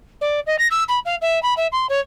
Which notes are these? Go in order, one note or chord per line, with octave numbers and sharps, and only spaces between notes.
D5
D#5
A#6
E6
B5
F5
E5
B5
E5
C6
C#5